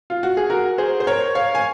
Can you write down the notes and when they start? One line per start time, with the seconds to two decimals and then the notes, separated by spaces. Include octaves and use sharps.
0.10 F4
0.23 F#4
0.37 G#4
0.50 F#4 A#4
0.78 G#4 C5
1.00 C5
1.07 A#4 C#5
1.35 C#5 F5
1.55 G#5